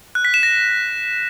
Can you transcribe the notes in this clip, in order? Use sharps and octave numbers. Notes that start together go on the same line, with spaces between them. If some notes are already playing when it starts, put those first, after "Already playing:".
F#6
B6
E7
A#6